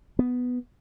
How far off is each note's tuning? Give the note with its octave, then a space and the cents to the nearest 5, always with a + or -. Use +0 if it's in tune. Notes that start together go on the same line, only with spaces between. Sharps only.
B3 +5